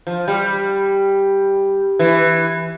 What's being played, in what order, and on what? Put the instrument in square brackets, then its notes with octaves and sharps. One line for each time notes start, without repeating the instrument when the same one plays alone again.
[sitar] F3
G3
E3